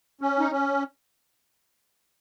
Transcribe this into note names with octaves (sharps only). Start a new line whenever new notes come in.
C#4
D#4
C#4